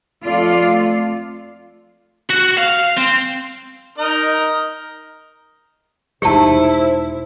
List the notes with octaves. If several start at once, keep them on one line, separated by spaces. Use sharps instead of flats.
F2 A3 F4 A4 D5 F5
F#4
F5
C4
D#4 A#4 D#5
E1 D#4 E4 G4 C5 A5